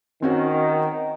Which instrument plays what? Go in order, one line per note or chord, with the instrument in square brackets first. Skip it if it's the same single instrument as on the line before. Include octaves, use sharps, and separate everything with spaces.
[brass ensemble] D#3 [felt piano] C4 C#4 F#4